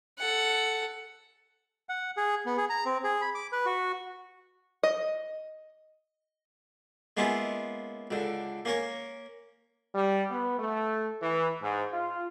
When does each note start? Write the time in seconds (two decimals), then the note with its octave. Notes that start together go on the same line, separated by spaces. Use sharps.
0.19 A4 F#5
1.89 F#5
2.17 G#4
2.46 B3
2.57 G#4
2.70 A#5
2.85 C4
3.04 G#4
3.22 B5
3.35 D6
3.52 B4
3.66 F#4
4.83 D#5
7.17 G#3 A#3 B3 C#4 E4 F4
8.11 C#2 D3
8.65 A#3 C#4 A#4 C#5
9.95 G3
10.31 B3
10.59 A3
11.22 E3
11.62 G#2
11.93 F4